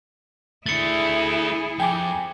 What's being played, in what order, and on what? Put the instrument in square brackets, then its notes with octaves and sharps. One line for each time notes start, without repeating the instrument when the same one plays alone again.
[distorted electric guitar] A3 D4 [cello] E4 G#4 [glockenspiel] A6 C#7
[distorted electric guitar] F2 [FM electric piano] G5 G#5 D6